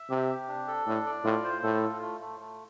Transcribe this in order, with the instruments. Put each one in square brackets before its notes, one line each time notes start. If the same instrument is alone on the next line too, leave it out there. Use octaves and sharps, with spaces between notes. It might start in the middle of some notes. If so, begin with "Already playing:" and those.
Already playing: [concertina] E5
[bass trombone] C3 [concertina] G4
[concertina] G4
D4
A4
[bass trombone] A2 [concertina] D4
[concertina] D5
[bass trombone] A2 [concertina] F4
[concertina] C5
[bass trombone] A2 [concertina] A4
[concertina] F4
A3
A3
A3